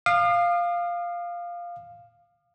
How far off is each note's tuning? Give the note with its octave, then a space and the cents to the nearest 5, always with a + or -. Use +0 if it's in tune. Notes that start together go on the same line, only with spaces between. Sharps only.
F5 +0 D#6 -45